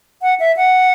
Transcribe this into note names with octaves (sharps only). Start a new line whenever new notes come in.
F#5
E5
F#5